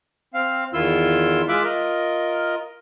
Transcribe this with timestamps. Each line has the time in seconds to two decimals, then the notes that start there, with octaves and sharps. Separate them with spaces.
0.34 C4 F5
0.74 E2 D#3 E4 F4 C6 E6
1.49 G#3 F4 E5 D6 F#6
1.63 F4 A#4 D#5